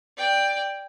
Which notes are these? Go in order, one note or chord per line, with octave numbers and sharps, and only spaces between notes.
D5 G5